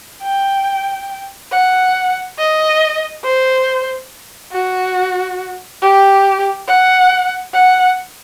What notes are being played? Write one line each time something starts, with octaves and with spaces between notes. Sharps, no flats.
G5
F#5
D#5
C5
F#4
G4
F#5
F#5